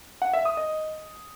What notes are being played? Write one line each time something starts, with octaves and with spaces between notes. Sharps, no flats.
F#5
E5
D#6
D#5